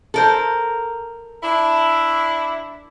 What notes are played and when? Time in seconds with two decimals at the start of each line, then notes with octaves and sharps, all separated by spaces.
0.14 A4 A#4 C5
1.43 D4 E4